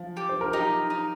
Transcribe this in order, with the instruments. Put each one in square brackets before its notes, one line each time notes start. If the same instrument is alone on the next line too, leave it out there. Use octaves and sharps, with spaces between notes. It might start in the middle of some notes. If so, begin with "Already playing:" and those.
Already playing: [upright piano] F3
[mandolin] G4
[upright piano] C5
A#4
[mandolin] D#4 [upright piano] G4
[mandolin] D#4